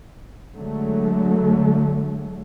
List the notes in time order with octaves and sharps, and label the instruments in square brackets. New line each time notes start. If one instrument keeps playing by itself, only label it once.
[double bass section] D3 F#3 G#3 A3